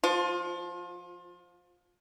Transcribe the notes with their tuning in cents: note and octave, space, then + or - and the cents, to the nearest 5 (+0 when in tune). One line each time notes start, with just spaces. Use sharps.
F3 +0 F4 +30